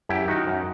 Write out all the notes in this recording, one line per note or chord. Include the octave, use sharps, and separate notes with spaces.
F#2 E4 G4
D#3 D#4 F#4
F#2